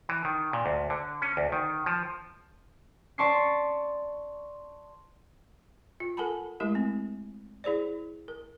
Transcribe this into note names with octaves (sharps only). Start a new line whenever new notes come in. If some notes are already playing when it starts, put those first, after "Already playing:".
E3
D#3
A#2
D2
D3
C#4
D2
D#3
F3
D5 A5 C6 C#6 B6 C7
F4
A4 A#4 F#5 G#5 A5 B5
G#3 A3 E4 G4 A#4
C4
E4 G#4 C5 D5
A#4